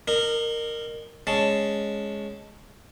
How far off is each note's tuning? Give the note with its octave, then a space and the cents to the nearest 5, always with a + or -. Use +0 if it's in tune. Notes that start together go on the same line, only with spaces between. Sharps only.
D#4 -40 A#4 -10
G#3 +0 C#4 +0 A5 +0